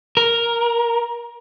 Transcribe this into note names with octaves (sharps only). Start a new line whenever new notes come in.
A#4